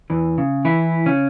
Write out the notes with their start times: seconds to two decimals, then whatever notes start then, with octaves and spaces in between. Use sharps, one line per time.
0.10 E2 E3
0.38 C#3
0.65 E3 E4
1.06 C#3 C#4